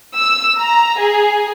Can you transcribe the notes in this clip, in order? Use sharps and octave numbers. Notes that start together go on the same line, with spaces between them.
E6
A#5
G#4